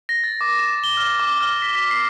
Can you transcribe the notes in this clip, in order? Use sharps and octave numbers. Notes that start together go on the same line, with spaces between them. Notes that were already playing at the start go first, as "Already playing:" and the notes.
A#6
A6
D6
E7
G7
F6
D6
F6
B6
B6
C7